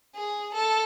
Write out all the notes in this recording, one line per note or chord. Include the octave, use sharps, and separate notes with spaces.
G#4
A4